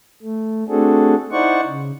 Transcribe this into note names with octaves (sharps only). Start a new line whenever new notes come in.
A3
A3 C4 D4 F#4 G#4 A4
D#4 E4 C5 D5 F#5 C#6
C#3